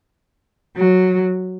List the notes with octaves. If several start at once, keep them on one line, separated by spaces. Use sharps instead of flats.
F#3